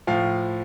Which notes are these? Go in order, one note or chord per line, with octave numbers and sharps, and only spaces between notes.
A2 F3 F5